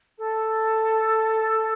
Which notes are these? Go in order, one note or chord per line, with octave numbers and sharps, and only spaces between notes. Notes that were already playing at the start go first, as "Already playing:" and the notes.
A4